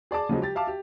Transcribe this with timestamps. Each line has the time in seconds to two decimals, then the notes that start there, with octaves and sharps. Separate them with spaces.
0.11 G#4 D5 A5 D6
0.29 C#3 F3 F#3 G#3
0.42 G4 A6
0.55 E5 F5 A5 D6
0.67 G4